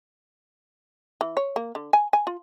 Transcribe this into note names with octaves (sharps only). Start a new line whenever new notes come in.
E3
C#5
A#3
D3
G#5
G#5
F4